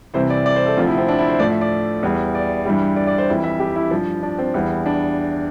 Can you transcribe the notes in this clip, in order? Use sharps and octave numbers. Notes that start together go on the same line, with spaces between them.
C2 C3 E3 C5
D5
D5
C5
A4
D2 C3 F3 F4
E4
C4
D4
E4
C5
A2 F3 D5
E5
D5
E2 E3 G3
D5
G2 E3 G3
D5
D5
C5
F2 E3 G3
E5
G4
E4
G2 F3
D4
C4
E2 E3 G3
D4